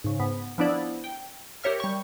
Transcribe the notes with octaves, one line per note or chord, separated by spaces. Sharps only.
G#2 C#3
G#2 B3
F3 B3 D4 E4 D5
G5
G4 A#4 C#5 E5 F6
G3 C#6